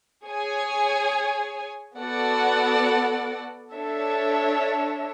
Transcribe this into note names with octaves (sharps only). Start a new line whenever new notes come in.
G#4 C#5 G#5
B3 F#4 A4 D5 F#5
D4 A4 C#5 E5